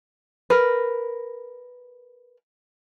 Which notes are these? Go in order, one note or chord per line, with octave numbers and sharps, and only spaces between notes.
A#4 B4